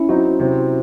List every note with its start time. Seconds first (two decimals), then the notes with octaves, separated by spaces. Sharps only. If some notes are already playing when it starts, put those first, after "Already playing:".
Already playing: C#4 E4
0.09 F#3 C4 D#4 F#4
0.39 C3 F#3 C4